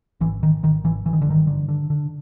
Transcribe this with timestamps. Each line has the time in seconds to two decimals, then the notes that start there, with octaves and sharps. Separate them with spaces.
0.21 G#1 E3
0.42 G#1 D#3
0.63 G#1 D#3
0.84 G#1 E3
1.05 G#1 E3
1.13 D#3
1.22 D3
1.27 G2 D#3
1.47 D3
1.68 D3
1.90 D3